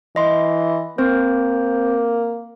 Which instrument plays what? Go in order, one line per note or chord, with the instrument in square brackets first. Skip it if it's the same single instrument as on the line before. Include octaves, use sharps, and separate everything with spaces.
[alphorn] E3 [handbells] D#5 C6
[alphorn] A#3 [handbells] C4 C5